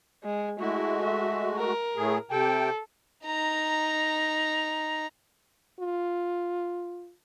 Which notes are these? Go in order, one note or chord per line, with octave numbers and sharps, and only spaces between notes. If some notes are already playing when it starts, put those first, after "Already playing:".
G#3
G#3 A3 E4 F#4
E5
A#4
A2 A3 G#4
C3 A4 G5
D#4 A#5
F4